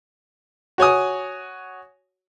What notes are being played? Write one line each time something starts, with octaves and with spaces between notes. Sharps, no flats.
F#4 C#5 G#5 D#6